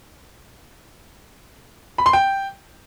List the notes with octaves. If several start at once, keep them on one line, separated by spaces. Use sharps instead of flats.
B5
C6
G5